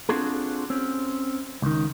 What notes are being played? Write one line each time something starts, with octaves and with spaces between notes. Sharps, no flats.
C4 D4 F4 F#4 G#4 A4
C4 C#4
C#2 D#3